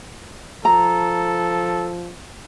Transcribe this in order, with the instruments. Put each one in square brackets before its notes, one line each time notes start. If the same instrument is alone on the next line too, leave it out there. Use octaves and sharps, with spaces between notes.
[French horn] F3 [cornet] A4 [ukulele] A#5